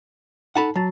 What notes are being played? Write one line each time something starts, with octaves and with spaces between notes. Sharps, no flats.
D#4 A4 F#5 A5 B5
F#3 A5 A6